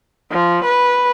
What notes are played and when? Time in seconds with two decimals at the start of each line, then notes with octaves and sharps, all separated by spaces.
0.31 F3
0.64 B4